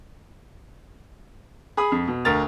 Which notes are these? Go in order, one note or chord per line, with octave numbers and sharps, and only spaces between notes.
G#4 B5 D#6
F2
B2
D2 A#4 A6 F7